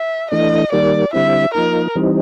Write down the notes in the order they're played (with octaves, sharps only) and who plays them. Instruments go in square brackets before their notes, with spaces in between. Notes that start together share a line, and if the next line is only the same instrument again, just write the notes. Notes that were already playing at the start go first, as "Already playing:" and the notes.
Already playing: [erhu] E5
[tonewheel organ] E3 A3 D4 [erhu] D#5
[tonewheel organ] D#3 G3 A#3 [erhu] D5
[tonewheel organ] D3 G3 C4 E4 [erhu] E5
[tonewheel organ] F3 A#3 D#4 [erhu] A#4
[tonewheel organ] E3 G3 C4 D#4